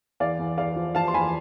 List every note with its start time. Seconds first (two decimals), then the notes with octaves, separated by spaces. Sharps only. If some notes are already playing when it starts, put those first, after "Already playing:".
0.20 E2 D5 F5
0.39 E2
0.58 E2 D5 F5
0.76 F3
0.95 F3 F5 A5
1.08 C6
1.14 E2 G#5 B5